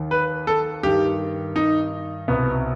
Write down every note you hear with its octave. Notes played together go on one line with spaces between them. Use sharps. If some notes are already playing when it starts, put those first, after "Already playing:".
Already playing: D#2 D#3
B4
A4
G2 D#3 G4
D#4
C2 B2 B3